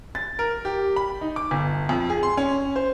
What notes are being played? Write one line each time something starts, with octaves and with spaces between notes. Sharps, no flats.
A6
A#4
G4
B5
D#4
D6
G1
F2
G#4
C6
C#4
C5